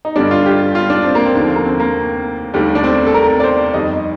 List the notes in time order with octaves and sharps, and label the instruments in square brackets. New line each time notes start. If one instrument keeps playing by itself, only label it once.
[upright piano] D#4
G2 D3 G3 D4
F4
G4
F4
D4
C4
A#3
C4
D#2 D3 F3
A#3
C4
A#3
D#2 D3 G3 A3
D4
C4
A4
A#4
D5
C5
F2 D#3 G3 D#5